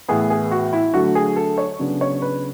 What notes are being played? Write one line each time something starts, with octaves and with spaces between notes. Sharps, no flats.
A2 E3 B3 G#4
G#4
F#4
E4
D3 F#3 A3 F#4
G#4
A4
C#5
C#3 F#3 B3 D4
C#5
B4